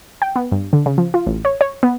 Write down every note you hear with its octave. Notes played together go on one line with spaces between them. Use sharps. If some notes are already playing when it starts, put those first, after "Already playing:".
G5
B3
G2
D3
C#3
F3
F4
A1
C#5
C#5
B3